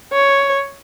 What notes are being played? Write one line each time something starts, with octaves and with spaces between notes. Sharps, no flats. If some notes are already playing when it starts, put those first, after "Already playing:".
C#5